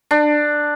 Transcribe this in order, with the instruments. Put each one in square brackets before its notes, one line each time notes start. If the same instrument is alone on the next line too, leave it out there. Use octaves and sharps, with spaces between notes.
[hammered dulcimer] D4